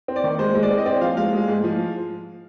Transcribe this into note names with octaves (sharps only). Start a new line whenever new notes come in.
C4
D5
D#3
G#3 C5
G#3
D5
C4
D#5
C4 D5
F3 F5
G#3 F5
G#3
G#2
F3